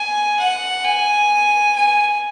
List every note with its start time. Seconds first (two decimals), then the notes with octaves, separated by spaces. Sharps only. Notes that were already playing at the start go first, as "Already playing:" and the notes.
Already playing: G#5
0.39 F#5
0.85 G#5
1.76 G#5